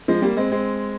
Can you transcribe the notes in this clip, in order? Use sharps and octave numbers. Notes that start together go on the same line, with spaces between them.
F3 G#3
G3 A#3
G#3 C4
G#3 C4